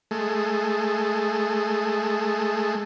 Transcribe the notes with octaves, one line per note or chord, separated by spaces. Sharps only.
G#3 A3